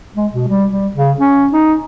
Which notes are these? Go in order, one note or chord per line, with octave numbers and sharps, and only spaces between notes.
G#3
B2
G3
G3
C#3
C#4
D#4